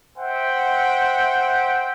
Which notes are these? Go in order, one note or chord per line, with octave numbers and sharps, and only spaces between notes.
C5 E5 F#5 G5